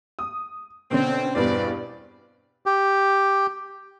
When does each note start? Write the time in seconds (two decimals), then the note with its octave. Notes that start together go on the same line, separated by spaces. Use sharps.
0.19 D#6
0.91 B2 D3 C4 C#4
1.35 E2 G2 B2 C4 B4 D5
2.66 G4